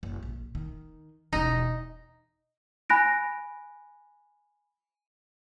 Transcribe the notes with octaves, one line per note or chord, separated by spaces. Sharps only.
F#1
A#1
D#3
E1 E2 D#4
G#5 B5 F#6 A#6 D7